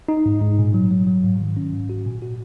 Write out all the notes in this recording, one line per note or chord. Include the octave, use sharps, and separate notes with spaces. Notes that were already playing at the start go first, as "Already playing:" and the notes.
D#4
G#2
G#2
A#2
F#3
F#3
F#3
G#2
D#3
C#4
G#2
F#4
A#2
F#4